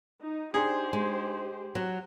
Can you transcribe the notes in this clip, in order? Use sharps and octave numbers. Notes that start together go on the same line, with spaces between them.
D#4
D4 D#4 G4 G#4 C5
G#3
F#3 F#4